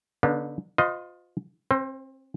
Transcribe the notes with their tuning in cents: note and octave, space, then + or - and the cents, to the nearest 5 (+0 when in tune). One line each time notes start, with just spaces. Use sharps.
D3 -40 B3 -35 D4 +40
F4 +25 C5 -35 D#5 +0
C4 +30 C5 -20